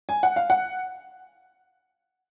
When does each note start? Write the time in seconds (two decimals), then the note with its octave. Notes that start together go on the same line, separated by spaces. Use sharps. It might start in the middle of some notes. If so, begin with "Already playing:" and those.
0.09 G#5
0.23 F#5
0.36 F5
0.50 F#5